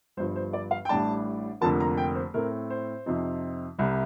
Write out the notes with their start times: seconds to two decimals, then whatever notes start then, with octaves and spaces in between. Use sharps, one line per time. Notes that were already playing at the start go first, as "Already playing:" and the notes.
0.17 G1 G2 F3 C5
0.36 C5
0.53 D5
0.71 F5
0.85 G5
0.89 A1 A2 G3 D4 A5
1.61 F1 F2 D3 F3 A#3 A5
1.80 A#5
1.98 G5
2.15 C5
2.34 A2 A3 C4 A#4
2.70 C5
3.06 F2 C3 F3 C4 D#4
3.78 C2 C3 G3